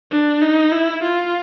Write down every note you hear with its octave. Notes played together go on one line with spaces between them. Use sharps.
D4
D#4
E4
F4